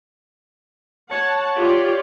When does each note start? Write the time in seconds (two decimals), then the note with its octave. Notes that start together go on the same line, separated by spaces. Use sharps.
1.11 C#5 F#5 A5
1.58 F4 G4 D5